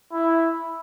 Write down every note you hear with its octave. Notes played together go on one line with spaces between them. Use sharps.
E4